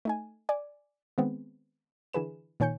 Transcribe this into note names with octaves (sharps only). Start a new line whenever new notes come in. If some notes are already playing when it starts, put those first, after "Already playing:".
A3 D#4 G#5
D5 G#5
D#3 G#3 B3 C4
D3 E3 G#4 B4 E7
A#2 D#3 C#5 G#5 G6 C#7